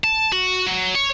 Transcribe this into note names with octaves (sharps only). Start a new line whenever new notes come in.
A5
F#4
F#3
C#5